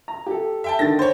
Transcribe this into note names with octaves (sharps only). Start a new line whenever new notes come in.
A#5
G4 A4
E5 G5 A5
D3 D#3 A6 A#6
C5 C#5